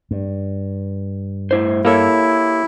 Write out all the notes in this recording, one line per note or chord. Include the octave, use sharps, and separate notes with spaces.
G2
A2 E4 C5
A#3 E4 G4 A4 C#5